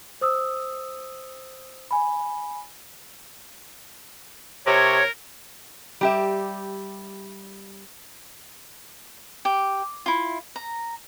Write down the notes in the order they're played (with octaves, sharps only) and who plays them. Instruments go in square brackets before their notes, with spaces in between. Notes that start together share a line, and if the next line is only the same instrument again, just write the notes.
[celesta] C5 D#6 E6
G#5 B5
[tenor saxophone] C3 [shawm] A#4 [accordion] C#5
[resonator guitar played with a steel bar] G3 G4 E5
[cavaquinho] G4
E4 F4
A#5